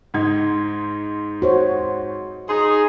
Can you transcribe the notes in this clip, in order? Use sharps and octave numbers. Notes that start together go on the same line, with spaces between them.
G#2 D#4 G#6
F#4 C5 C#5
D#4 G#4 C6